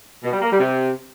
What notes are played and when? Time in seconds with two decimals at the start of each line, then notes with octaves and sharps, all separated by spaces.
0.24 B2
0.33 G3
0.42 A#3
0.51 G3
0.60 C3